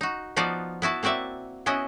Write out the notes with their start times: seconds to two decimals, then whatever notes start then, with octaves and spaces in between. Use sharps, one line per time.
0.01 D#4 F#4
0.36 F3 B3 D#4 F4 F#4 D5
0.82 B3 E4 F#4 A5
1.03 A#3 C4 F#4 D5 E5
1.66 B3 C#4 E4 F#4 D#5